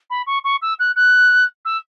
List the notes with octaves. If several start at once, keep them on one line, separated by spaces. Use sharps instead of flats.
B5
C#6
C#6
E6
F#6
F#6
E6